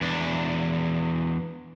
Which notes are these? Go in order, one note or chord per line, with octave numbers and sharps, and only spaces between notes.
E2 D4